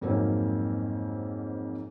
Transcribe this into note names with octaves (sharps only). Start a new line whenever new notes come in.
F2 G#2 F#3 A#3 C4 C#4